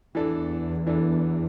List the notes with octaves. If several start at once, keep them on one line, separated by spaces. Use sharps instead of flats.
E2 E3 D4 A4
E3 D4 A4